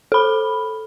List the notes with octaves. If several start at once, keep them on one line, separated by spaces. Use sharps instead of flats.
A4 B5